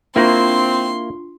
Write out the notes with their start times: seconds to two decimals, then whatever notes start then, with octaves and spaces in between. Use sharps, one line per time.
0.16 A#3 C4 D4 E4 F4 C6 C#6